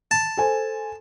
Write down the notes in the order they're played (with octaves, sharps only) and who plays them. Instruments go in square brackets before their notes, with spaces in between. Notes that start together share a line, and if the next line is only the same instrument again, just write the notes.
[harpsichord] A5
[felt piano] A4 C5 G#5